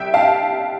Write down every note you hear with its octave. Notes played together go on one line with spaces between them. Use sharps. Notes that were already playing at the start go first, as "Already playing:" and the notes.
Already playing: C2 E5 G5
F5 A5